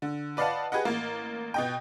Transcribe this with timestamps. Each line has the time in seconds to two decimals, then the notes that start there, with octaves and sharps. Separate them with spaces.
0.02 D3
0.37 B4 D5 D#5 F5 F#5 A5
0.72 G4 G#4 B4 D#5 F#5
0.85 A1 A#3
1.54 B2 D#5 G5